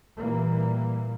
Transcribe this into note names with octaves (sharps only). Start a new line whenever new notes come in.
A#2 E3 G3 A#3